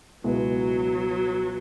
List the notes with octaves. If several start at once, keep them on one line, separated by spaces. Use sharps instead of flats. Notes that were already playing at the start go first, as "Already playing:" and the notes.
C#2 B2 F#3 G#3 B3 E4